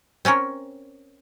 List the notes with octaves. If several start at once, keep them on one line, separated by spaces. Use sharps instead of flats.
C4 C#4 A#4 C#5